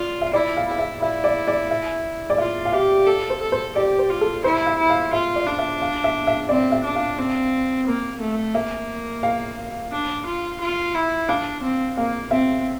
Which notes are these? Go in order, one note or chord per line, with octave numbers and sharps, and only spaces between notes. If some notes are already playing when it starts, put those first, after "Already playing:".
Already playing: F4 D5
E5
E4 D5
F5
E4 F5
E5
E4 E5
D5
D5
E5
D5
F4 E5
F5
G4 E5
A4
C5
A4
C5
G4 D5
C5
F4
A4
E4 C5
E5
E4
F5
F4 E5
D5
D4
E5
F5
E5
E5
C4 D5
E5
D4
F5
C4
A#3
A3
A#3 E5
F5
D4
F4
F4
E4
D4 F5
C4
A#3 F5
C4 E5